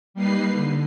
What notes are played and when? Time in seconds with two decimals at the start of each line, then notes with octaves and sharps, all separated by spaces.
0.14 G3 A#3 D#4 B4 C7
0.51 D3